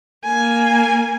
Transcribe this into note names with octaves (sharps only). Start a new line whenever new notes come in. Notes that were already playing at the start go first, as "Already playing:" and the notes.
A#3 G#5